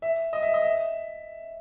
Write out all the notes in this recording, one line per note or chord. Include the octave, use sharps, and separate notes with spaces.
E5
D#5
E5
D#5
E5